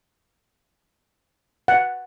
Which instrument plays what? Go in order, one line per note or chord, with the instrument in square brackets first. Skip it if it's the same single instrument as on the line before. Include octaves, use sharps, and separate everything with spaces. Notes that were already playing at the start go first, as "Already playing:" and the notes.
[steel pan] F#5